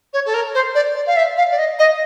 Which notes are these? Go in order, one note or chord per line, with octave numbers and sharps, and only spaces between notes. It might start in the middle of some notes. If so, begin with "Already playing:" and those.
C#5
A4
A#4
C5
D5
D5
F5
E5
F5
D5
D#5
D#5